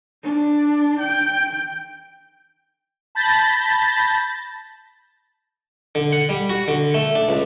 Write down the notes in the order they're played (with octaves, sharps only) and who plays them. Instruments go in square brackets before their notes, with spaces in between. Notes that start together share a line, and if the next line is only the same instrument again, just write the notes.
[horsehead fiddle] D4
G5
[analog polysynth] A5 B5 G6 A6 A#6
[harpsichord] D3
F#5
G3
F#4
D3
A3
D4
C#2